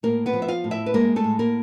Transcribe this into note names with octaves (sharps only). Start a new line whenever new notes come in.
A2 A#3 A#4
B3 B4
F3
E5
F4 F5
A2
E4 E5
B4
G#3 A#3 A#4
A3 A4
A2
A#3 A#4